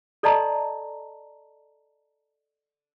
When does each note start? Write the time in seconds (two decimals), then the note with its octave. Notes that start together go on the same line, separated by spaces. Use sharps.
0.23 A4 D5 D#5 A5 A#5 C6